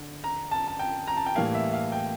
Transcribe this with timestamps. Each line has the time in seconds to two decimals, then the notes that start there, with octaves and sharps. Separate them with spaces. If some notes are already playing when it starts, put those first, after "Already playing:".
Already playing: D3
0.24 A#5
0.51 A5
0.68 A5
0.79 G5
1.07 A#5
1.17 A5
1.26 G5
1.35 A2 E3 G3 A#3 F5
1.55 E5
1.73 F5
1.92 G5